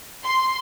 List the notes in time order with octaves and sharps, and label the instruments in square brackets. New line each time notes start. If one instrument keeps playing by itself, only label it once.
[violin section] C6